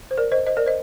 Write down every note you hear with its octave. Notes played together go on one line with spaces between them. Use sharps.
C5
A#4 D5
C5 D#5
C5 D#5
A#4 D5
C5 D#5